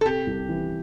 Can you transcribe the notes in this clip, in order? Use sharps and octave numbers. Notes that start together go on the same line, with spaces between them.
A4
C3 G4
C2
E3